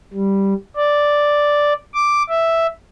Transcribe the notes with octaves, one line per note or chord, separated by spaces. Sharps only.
G3
D5
D6
E5